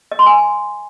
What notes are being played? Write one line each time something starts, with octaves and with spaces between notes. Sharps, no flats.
D#5
C6
G#5